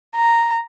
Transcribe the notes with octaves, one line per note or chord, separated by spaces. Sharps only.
A#5